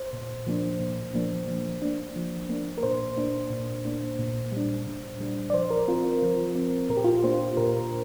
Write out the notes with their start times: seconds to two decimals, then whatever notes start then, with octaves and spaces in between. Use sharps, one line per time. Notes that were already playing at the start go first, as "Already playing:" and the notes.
Already playing: C5
0.13 A#2
0.47 F3 A#3 D4
0.80 A#2
1.14 F3 A#3 D4
1.48 F3
1.82 A#3 D4
2.16 F3
2.49 A#3 D4
2.78 A#4
2.83 A#2 C5
3.17 A#3 D4
3.51 A#2
3.85 A#3 D4
4.19 A#2
4.52 G3 D4
4.87 A#2
5.20 G3 D4
5.50 D5
5.54 F3 C5
5.70 A#4
5.88 C4 F4
6.22 F3
6.55 C4
6.90 A#2 A#4
6.97 G4
7.04 F4
7.12 G4
7.23 A#3 D4 C5
7.57 A#2 A#4